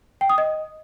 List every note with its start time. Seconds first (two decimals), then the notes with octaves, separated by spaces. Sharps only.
0.21 G5
0.29 D#6
0.38 D#5